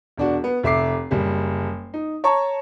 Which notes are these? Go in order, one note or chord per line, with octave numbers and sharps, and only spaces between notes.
E1 D4 F#4
B3
F1 E5 D6 C7
F#1 G3
D#4
C#5 A5 A#5 C#6